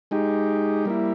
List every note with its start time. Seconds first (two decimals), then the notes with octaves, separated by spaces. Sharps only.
0.11 G#3 D#4 G4
0.85 G3 A#3 E4